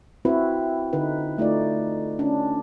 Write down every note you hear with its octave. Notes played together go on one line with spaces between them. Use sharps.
C4 E4 F#4 B4
D3 D#4 B4
A3 D#4 F4 D5
C#4 D4